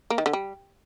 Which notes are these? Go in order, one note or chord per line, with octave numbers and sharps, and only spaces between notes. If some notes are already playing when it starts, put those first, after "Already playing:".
A#3
D#3
D3
G3